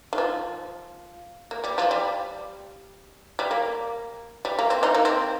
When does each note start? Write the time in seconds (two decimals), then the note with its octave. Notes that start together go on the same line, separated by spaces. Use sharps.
0.13 D#3
0.18 F3
1.51 A#3
1.64 G3
1.78 F3
1.91 G3
3.39 G3
3.51 A#3
4.45 G3
4.59 A#3
4.70 C4
4.83 D#3 D#4
4.95 A#3
5.05 C4